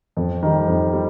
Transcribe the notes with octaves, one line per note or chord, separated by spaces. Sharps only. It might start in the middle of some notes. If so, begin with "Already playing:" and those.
F2
D#3 G3
F2
G3